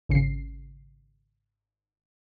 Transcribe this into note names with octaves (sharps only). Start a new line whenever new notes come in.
G#1 C#3 C7